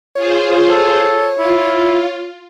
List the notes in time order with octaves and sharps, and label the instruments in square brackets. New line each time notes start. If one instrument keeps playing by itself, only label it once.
[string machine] F4 G#4 C5 [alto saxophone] C#5
[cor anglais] A4
[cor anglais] E4 [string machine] F4